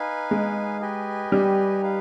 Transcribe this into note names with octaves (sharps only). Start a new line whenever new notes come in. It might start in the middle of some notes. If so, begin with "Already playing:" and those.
Already playing: D#4 B4 F5 G#5
G#3
G4 B4 D#5 G#5
G3
D#4 B4 F5